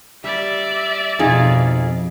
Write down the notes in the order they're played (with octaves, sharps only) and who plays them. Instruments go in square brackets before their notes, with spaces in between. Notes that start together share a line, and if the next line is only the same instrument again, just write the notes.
[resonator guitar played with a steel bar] G3 [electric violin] D5 E5
[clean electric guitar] F2 [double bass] B2 [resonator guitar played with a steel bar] D#4 F4 G#4